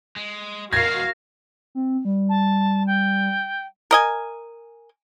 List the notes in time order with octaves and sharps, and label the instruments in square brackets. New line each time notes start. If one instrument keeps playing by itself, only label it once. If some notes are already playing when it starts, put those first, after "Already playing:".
[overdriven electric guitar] G#3
[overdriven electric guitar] E2 G#3 [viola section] F#4 A#4 F5 [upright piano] G#6 C7 [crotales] A#6
[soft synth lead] C4
G3
[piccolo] A5
G5
[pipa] A#4 D#5 G#5